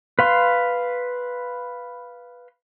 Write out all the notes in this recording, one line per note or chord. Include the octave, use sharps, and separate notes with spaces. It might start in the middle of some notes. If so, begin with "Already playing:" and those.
B4 F5 C6